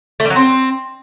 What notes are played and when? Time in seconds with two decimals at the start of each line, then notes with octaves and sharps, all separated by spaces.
0.20 A3
0.25 G3
0.30 F#3
0.36 C4